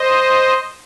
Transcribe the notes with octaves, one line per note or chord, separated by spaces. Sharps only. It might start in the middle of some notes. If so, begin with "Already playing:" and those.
Already playing: C5 D#5